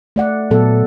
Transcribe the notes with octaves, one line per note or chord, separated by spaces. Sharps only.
A3 D5 F#5
A#2 F#3 B3 A4